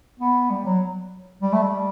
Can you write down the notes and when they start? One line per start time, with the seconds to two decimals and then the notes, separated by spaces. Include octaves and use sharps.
0.19 B3
0.50 G3
0.65 F#3
1.42 G3
1.53 A3
1.63 G3